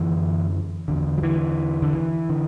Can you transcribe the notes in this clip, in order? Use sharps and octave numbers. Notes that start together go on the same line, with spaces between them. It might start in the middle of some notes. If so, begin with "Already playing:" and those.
Already playing: F#2 D3 E3
E2 D3
F#3
E3
D3
E3
D3